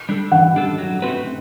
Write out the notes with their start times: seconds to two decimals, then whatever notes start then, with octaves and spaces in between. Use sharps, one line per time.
0.09 G3 D4 A4
0.31 E3 F#5
0.56 G3 D4 A4
0.78 F#3
1.02 A3 C4 F#4 B4